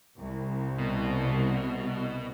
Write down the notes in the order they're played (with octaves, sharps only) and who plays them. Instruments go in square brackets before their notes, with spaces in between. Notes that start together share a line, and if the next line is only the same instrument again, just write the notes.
[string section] C2
[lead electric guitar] B2